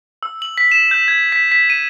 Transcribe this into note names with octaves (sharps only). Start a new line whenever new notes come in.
E6
F#7
B6
E7
G6
G#6
B6
B6
D#7